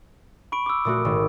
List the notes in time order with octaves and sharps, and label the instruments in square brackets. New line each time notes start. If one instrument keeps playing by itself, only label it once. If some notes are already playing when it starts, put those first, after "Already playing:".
[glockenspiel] B5 C#6 D7
D6 E6
[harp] A#2 A3 F#4 [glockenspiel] D#6
[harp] G#1